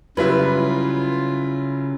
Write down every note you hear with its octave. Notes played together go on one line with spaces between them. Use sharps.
C#3 F#3 G3 E4 F4 B4